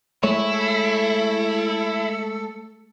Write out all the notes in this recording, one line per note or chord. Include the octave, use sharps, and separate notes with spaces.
G#3 A3 E4 C#5 E5
A4